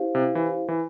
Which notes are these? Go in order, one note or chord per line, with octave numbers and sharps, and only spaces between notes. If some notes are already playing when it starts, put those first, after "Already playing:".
Already playing: C#4 E4 G4 C5 F5
C3
E3
E3